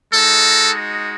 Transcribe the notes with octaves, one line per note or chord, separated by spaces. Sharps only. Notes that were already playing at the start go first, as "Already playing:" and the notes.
G#3 D#4 F#4 A4